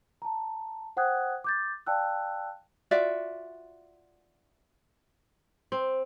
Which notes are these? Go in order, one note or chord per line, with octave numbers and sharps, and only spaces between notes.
A5 A#5
C5 F#5 G5 D#6 F#6 G#6
D6 G6 A6
D5 F5 G5 A5 E6 F#6
F4 F#4 D5 E5
C4